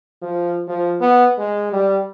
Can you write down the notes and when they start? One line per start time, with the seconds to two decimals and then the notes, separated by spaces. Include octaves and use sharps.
0.22 F3
0.68 F3
1.01 B3
1.38 G#3
1.73 G3